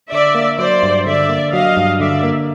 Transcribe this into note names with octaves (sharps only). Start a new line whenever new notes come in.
D3 D5 E5
A#3
F#3 C5 D5
G2
D3 D5 E5
A#3
F#3 D#5 F5
G2
D3 D5 E5
A#3